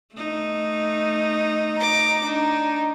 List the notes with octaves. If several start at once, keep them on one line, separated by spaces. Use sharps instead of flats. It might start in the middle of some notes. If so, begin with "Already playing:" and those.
A3 D#4
A#5 D6
D4 D#4